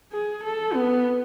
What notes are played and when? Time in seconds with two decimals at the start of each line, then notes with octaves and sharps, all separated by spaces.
0.12 G#4
0.44 A4
0.74 B3